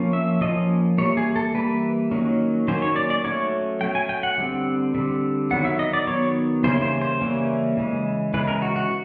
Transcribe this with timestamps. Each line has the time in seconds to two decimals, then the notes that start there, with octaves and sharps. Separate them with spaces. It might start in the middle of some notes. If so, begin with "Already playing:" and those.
Already playing: F3 A#3 C#4
0.13 E5
0.41 F3 A#3 C#4 D#5
0.98 E3 G3 A#3 C#5
1.17 G#4
1.36 A4
1.54 E3 G3 A#3 B4
2.11 D#3 F#3 A#3 C#4
2.68 D#3 F#3 A#3 C#4 C5
2.82 C#5
2.96 D5
3.10 D5
3.24 F#3 A3 C#4 C#5
3.81 F#3 A3 C#4 G5
3.95 G#5
4.09 G5
4.23 F#5
4.38 D3 G3 C4
4.95 D3 G3 C4
5.51 D#3 F#3 B3 F#5
5.65 E5
5.79 D#5
5.93 D5
6.07 D#3 F#3 B3 C#5
6.64 C#3 E3 G3 A#3 C#4 C5
6.82 C5
7.02 C5
7.21 C#3 E3 G3 A#3 C#4
7.77 C#3 E3 G#3
8.34 C#3 E3 G#3 B4
8.48 A#4
8.62 F#4
8.76 F#4